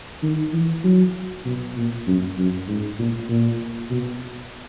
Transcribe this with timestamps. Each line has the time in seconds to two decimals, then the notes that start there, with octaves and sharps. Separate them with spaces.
0.23 D#3
0.53 E3
0.84 F#3
1.45 B2
1.77 A#2
2.07 F#2
2.38 F#2
2.68 G#2
2.99 A#2
3.29 A#2
3.90 B2